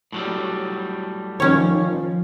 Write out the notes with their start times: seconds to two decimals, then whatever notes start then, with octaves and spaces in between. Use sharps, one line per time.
0.12 A2 F#3 G3
1.40 D#3 F3 C#4 C#5